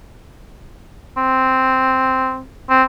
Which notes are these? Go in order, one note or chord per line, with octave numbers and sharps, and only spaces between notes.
C4
C4